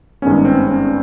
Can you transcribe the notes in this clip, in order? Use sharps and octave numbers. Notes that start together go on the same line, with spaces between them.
G#1 G2 D#3 G#3 B3 C#4
C4
C#4